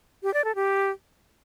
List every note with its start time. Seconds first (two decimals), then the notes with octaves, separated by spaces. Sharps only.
0.23 G4
0.34 D5
0.44 A4
0.55 G4